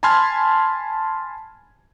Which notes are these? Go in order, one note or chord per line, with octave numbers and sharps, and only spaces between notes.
G#5 A5 B5 C6 F6 G#6